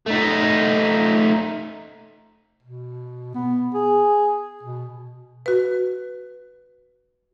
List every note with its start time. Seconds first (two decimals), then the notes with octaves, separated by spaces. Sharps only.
0.06 A3 D#4
2.63 B2
3.35 B3
3.74 G#4
4.63 B2
5.46 F#4 B4